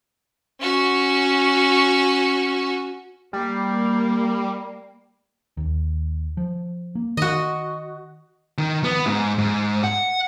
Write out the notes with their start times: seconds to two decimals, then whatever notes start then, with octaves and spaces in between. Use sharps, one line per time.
0.61 C#4 F#4
3.33 G3 A#3
5.57 D#2
6.37 F3
6.95 A#3
7.17 D#3 F#4 D#5
8.58 D#3
8.84 B3
9.06 G#2
9.38 G#2
9.84 F#5